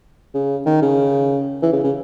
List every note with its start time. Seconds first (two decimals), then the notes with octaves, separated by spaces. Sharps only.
0.34 C#3
0.66 D#3
0.82 C#3
1.63 E3
1.73 C#3
1.84 C#3